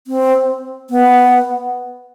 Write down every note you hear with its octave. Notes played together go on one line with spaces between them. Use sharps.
C4
B3